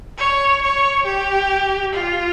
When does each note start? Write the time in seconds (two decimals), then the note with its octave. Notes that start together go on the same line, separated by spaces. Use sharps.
0.18 C#5
0.62 C#5
1.06 G4
1.93 F4